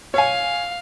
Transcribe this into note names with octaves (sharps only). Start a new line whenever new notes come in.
C#5 F5 G#5